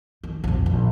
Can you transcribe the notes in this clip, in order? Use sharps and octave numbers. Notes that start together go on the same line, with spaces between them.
D#3
A#1 F2
A#1